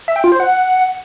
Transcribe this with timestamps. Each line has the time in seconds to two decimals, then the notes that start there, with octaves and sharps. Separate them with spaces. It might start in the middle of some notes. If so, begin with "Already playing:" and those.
0.08 E5
0.16 G5
0.24 F4
0.32 C5
0.40 F#5